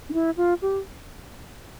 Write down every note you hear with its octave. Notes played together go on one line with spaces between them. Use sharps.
D4
E4
F4
G4